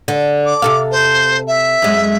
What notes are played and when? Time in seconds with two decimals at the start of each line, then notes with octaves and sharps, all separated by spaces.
0.08 D3
0.46 D6
0.62 C3 A4 F5
0.91 C5
1.47 E5
1.82 F#2 G#3